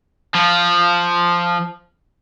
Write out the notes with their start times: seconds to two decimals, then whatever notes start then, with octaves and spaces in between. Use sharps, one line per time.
0.35 F3